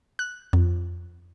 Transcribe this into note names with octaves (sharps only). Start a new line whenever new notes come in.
F#6
F2